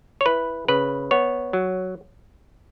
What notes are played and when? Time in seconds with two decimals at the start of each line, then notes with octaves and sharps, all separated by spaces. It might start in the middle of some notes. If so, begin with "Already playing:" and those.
0.21 C#5
0.26 E4 B4
0.68 C#3 B4
1.11 B3 C#5
1.53 F#3